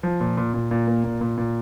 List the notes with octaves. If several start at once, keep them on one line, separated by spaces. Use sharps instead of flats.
F3
A#2
A#2
A#2
A#2
A#3
A#2
A#2
A#2